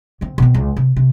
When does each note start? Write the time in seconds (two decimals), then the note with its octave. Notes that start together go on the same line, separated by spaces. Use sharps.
0.21 D3 C4
0.38 B2 C4
0.54 C#2
0.76 C3
0.96 C3